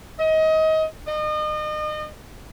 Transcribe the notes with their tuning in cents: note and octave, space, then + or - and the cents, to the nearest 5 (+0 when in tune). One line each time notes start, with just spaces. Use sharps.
D#5 +25
D#5 -35